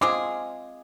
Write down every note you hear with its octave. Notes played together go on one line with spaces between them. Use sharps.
G#3 C4 F4 G#4 D6